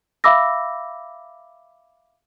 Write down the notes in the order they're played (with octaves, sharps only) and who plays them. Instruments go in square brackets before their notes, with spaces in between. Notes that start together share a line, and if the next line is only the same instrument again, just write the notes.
[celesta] E5 F5 B5 D6 E6 A#6